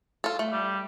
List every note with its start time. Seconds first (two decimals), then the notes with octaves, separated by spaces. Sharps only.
0.24 F4 A4
0.39 A3
0.52 G3